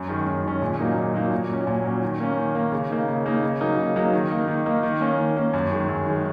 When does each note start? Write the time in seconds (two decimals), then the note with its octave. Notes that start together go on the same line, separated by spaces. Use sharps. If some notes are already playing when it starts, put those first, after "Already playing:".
Already playing: F#2
0.08 D#3 G#3 C#4
0.26 F#2
0.44 D#3 G#3 C#4
0.62 A#2
0.79 F#3 A#3 D#4
0.96 A#2
1.14 F#3 A#3 D#4
1.31 A#2
1.49 F#3 C#4
1.67 A#2
1.84 F#3 C#4
2.02 D#3
2.20 A#3 C#4
2.37 D#3
2.55 A#3 C#4
2.72 C#3
2.90 A#3 D#4
3.08 C#3
3.26 A#3 D#4
3.43 C#3
3.61 F#3 A#3 D#4
3.78 C#3
3.96 F#3 A#3 D#4
4.13 D#3
4.31 A#3 D#4
4.48 D#3
4.66 A#3 D#4
4.83 D#3
5.01 A#3 C#4
5.19 D#3
5.36 A#3 C#4
5.53 F#2
5.71 D#3 G#3
5.89 F#2
6.06 D#3 G#3